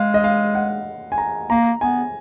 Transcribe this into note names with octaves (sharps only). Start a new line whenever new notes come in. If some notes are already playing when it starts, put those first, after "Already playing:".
Already playing: G#3 F5
D#5
F5
F#5
G#5
A#5
A#3 A#5
B3 G#5